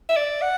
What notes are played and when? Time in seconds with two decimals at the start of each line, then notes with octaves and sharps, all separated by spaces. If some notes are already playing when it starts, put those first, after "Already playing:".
0.09 E5
0.16 D5
0.42 F#5